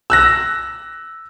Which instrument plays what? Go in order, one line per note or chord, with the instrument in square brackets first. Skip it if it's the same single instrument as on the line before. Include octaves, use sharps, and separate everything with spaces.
[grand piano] E6 F#6 A#6